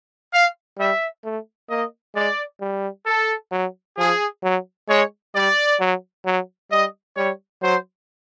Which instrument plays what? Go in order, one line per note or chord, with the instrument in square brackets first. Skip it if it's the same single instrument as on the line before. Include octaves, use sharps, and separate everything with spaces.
[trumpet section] F5
[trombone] G3 [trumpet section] E5
[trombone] A3
[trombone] A#3 [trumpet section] D#5
[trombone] G#3 [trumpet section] D5
[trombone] G3
[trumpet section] A4
[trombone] F#3
[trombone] F3 [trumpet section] G#4
[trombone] F#3
[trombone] G#3 [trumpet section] C#5
[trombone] G3 [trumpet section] D5
[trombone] F#3
F#3
[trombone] G3 [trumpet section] D#5
[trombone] G3 [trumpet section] C#5
[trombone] F#3 [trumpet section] C5